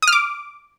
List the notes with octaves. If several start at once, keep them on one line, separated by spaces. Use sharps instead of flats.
D#6
F6
D6